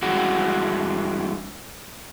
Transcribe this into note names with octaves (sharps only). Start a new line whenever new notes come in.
G2 E3 G#3 F#4